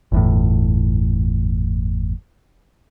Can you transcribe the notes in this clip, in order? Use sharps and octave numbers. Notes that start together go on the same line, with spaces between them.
G1 E2 A2